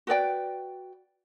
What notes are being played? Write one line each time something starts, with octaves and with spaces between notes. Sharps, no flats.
F#4 B4 D5 G5